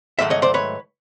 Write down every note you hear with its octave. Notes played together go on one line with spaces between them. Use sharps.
G#2 D#3 F#3 A3 E5
C#5 D#5
C5 D5
B4 C#5